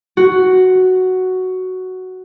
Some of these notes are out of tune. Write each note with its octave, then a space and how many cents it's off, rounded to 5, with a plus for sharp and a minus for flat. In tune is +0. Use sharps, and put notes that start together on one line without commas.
F#4 +5